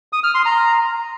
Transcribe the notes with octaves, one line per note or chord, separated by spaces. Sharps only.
D#6
F6
C6
A#5